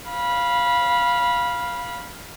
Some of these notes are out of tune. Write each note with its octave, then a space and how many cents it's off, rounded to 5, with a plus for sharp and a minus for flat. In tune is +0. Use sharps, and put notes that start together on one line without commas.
F5 +0 B5 -20